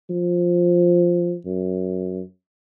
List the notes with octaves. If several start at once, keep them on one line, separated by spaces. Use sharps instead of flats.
F3
F#2